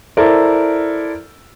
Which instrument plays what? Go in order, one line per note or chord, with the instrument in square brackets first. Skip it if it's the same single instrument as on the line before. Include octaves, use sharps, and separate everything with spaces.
[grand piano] E4 A4 A#4 C5 D5